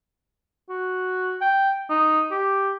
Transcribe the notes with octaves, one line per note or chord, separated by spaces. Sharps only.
F#4
G5
D#4
G4